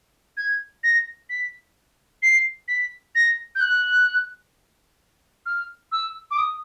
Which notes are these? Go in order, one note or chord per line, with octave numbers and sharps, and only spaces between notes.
G#6
A#6
B6
C7
B6
A#6
G6
F#6
F6
E6
D6
D#6